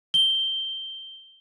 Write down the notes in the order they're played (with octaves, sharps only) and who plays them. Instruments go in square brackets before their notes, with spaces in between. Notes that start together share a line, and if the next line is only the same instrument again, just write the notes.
[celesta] G7